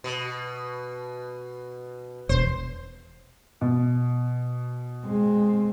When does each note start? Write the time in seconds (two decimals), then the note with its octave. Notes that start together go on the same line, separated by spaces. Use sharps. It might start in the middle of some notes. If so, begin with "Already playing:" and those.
0.04 B2
2.29 E1 C5
3.61 B2
5.06 G#3 C4